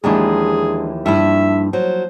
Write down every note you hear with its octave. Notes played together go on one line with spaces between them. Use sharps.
D#2 E3 F3 G#3 B3 D4 G#4
G2 F3 D4 E4 E5
F#3 C5